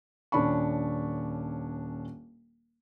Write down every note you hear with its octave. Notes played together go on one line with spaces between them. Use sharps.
D#1 C#4 D4 B5 C#6